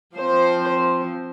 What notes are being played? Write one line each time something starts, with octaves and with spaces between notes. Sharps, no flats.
F3 C4 C5